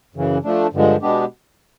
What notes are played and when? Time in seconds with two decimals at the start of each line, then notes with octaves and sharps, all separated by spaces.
0.15 F#2 C#3 E3
0.44 F3 A3 D4
0.73 G2 D3 F3 G#3
1.02 B2 G#3 B3 D4 G4